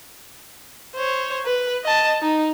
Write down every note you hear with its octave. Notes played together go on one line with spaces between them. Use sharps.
C5 C#5
B4
D#5 A5
D#4